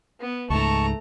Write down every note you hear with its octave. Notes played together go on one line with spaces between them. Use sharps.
B3
C#2 G#2 A3 A5 A#5 C#6